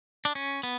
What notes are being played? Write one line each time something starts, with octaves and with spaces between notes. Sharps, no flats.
D4
C#4
B3